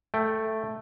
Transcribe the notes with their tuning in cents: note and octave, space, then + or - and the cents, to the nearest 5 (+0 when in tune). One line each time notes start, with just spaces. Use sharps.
A3 +0 G5 +0